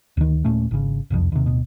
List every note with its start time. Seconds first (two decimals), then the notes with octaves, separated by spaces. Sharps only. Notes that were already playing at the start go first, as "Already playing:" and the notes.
0.17 D2 D#3
0.44 D#1 A#2 A3 C#4
0.71 G#1 C#3
1.10 E1 C2 F2
1.32 D#2 C3
1.46 D1 B2